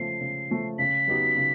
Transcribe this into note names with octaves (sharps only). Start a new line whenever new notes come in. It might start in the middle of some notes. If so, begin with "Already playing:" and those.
Already playing: C#3 F3 A3 C7
C#3
F3 A3
C#3 B6
F#3 B3 D#4 G4
C#3